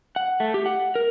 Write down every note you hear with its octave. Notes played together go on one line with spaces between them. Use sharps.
F#5
A3
G4
F#5
A#4